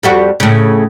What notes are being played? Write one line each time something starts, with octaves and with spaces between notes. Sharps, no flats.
F2 G3 F#4
A2 C#3